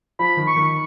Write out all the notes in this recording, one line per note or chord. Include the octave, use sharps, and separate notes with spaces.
F3 B5
D#3
C#6
D#3